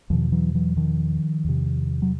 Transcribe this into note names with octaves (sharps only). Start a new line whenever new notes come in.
E2 B2 D#3 F3
E3 F#3
E3 F#3
D#3 F3
E2 C3
F#3